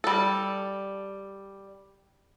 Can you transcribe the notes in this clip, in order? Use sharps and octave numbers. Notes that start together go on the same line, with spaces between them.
G3 A4